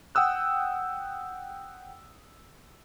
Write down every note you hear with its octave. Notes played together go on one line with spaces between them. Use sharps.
F#5 G5 D#6 E6 F#6